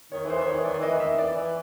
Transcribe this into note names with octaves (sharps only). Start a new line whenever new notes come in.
D#3 C#5
E3 C5
D#3
C#5
E3
D#3 D5
E3 D#5
D#3
E5
E3 D5
E3